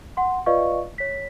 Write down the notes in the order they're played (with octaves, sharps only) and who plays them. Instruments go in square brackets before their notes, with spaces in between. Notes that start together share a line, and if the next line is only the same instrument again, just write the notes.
[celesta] F#5 C6
F4 B4 D5 D#5 F5 C#6
C#5 B6